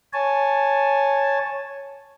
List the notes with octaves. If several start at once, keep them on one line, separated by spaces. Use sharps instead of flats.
C#5 G#5 A5